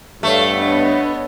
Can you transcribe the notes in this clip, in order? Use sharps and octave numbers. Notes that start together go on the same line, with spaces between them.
G2 A3 A4 C#5 E5 F5
B3 D4 C#5 D#5